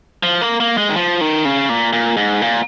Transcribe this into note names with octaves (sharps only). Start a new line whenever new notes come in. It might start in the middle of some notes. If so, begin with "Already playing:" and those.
F3
A#3
A#3
G#3
D#3
F3
D#3
C#3
A#2
A#2
G#2
A#2